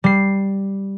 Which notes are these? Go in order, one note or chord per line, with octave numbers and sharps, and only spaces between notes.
G3 C7